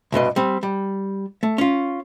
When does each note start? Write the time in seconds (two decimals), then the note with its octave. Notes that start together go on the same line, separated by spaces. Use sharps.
0.12 C2 G2 B2 D#5
0.36 G3 C4
0.63 G3
1.43 A3
1.58 C#4 F4